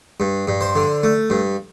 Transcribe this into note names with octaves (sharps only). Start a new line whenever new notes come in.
G2
G2
C5
D3
A3
G2